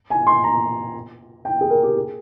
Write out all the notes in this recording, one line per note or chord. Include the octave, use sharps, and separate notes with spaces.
G#5
C6
A#5
G5
G#4
A#4
G4
G#4